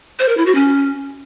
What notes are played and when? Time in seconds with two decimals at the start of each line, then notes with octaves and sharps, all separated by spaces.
0.20 C5
0.29 A#4
0.37 E4
0.46 F#4
0.55 C#4